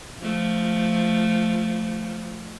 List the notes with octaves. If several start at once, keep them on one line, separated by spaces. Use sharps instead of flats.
F3 A3